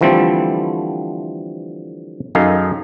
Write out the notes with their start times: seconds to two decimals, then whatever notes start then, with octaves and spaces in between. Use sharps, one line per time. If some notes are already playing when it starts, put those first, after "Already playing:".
0.01 D3 E3 F3 G3 A3 C4
2.35 F#2 D#3 D#4 G#4 A4 F5